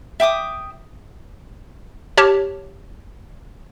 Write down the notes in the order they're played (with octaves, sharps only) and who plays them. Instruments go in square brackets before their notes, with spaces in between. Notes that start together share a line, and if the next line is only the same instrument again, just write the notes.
[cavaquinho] E5 G5 D6 D#6
[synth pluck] G4 C#5 A5 F6